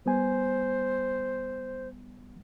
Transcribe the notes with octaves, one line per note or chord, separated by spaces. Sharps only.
G3 B3 C5 G#5